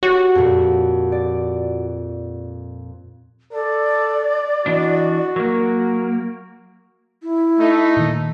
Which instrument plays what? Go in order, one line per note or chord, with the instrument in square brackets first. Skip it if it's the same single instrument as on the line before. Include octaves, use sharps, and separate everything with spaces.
[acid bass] F#4 [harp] G4 C#5
[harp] F2 A#2
D5
[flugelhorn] A4 [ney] D5
[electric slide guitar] E3 D4 [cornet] F#4 [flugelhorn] D#5
[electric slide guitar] F#3 A#3 [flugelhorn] A#4
[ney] E4
[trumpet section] A3 D#4
[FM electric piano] A#2 D#3